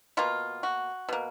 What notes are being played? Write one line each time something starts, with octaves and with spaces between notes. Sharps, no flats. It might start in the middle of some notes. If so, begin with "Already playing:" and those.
B2 A#3 F4
F#4
B2 A#3